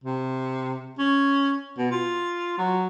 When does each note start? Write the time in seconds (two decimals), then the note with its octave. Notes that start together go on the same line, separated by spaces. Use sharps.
0.04 C3
0.99 C#4
1.78 B2
1.92 F4
2.58 F#3